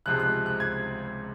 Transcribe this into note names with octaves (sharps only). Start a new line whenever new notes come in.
C#2 C3 F3 G#3 F#6
F#6
F#6
G#6